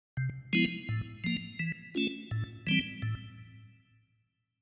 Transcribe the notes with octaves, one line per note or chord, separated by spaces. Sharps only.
C3
F3 G#3 B3 E4
A2
F3 A#3
E3
A3 C#4 F4
A2
E3 G3 C4
A2